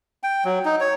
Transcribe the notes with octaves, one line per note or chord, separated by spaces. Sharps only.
G5
F#3
D#4
C#5